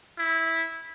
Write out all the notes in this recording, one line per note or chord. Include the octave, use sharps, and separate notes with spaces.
E4